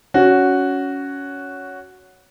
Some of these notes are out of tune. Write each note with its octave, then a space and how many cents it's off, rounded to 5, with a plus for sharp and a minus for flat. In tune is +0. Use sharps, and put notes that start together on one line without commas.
C#4 +15 F#4 +0